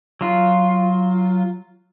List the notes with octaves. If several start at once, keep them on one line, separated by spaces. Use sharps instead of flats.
F#3 F4